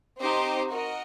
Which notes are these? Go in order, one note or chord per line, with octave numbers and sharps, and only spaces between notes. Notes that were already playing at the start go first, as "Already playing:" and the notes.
C4 D#4 G4 C5 D#5
F#4 A#4 D#5